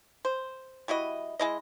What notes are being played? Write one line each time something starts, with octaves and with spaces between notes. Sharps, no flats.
C5
G3 E4 F#4 D#5
G#3 E4 D#5